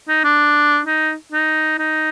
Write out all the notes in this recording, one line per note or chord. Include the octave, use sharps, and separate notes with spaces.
D#4
D4
D#4
D#4
D#4